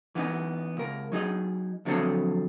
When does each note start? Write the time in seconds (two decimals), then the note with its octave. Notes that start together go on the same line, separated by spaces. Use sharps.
0.15 E3 B3 C#4 D#4
0.77 C#2 A#4
1.12 F#3 D#4 G#4 D#5
1.85 F2 D3 F#3 C4 A4 C#5